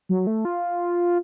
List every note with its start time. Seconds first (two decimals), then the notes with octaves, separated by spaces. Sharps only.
0.09 F#3
0.27 A3
0.45 F4